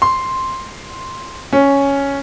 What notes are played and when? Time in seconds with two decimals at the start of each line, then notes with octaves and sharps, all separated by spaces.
0.02 C6
1.53 C#4